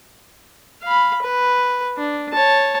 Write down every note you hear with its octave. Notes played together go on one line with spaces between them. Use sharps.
F5 B5
B4
D4
C#5 A5